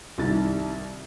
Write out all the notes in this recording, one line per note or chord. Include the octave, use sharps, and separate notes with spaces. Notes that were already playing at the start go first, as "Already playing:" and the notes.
C2 D#3 E4 A6